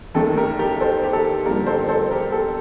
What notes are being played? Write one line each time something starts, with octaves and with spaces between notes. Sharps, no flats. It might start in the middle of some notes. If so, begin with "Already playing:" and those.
D#2 D#3 A3 A4
G4 A#4
G4 A#4
A4 C5
G4
A4
G2 D3 F3 A#3 G4 A#4
A4 C5
A4 C5
G4 A#4
A4